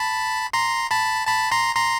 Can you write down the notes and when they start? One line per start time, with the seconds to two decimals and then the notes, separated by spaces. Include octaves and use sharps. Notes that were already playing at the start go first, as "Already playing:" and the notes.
Already playing: A5 B5
0.53 A#5 C6
0.91 A5 B5
1.27 A5 B5
1.51 A#5 C6
1.75 A#5 C6